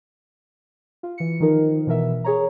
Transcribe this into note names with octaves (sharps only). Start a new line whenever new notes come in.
F4
E3 C#7
D#3 F3 D#4 A#4
B2 E3 A#4 E5
G#4 C#5 A#5